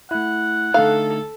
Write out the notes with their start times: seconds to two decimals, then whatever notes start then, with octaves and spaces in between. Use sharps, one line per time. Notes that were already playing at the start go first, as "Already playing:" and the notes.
0.11 A3 E4 F#5
0.74 D3 A3 D#4 A4 F5